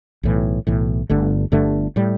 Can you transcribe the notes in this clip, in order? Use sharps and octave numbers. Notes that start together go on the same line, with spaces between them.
B1 A2 E3
B1 A2 E3
G1 G2 D3 A3
G1 G2 D3 A3
A2 G3